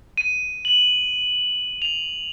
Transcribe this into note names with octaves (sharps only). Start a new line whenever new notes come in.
D#7
F#7
F7